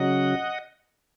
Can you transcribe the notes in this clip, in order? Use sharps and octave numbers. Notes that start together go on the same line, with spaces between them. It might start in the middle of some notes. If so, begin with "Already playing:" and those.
Already playing: C#3 F#3 D#5 F#5